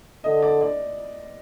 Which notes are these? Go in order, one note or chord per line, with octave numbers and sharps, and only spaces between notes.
D3 D#5
D5
D5